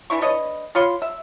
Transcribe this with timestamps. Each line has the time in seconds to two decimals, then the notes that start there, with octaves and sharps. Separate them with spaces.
0.10 E3 D4 E4 C#6
0.21 D4 B4 C#5 D#5
0.75 F4 C#5 B5 C6
1.02 E5